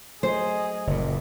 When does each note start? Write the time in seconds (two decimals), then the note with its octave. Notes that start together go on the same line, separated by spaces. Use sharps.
0.23 F#3 A3 G#4 C5 D#5
0.87 F#1 A#2